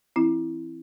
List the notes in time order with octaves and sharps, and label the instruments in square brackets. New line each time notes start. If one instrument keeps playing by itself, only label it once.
[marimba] E3 C4 E4